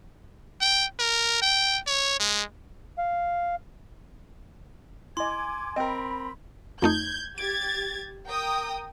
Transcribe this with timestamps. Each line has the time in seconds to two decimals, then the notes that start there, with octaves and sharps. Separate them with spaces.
0.61 G5
0.99 A#4
1.42 G5
1.87 C#5
2.20 G#3
2.98 F5
5.17 E4 D#5 G#5 C6 D6 G#6
5.76 C4 A#4 D#5 G5 B5
6.82 F2 A3 D#4 G6 G#6
7.38 G4 G#6 A6 D7
8.28 A#4 G5 D#6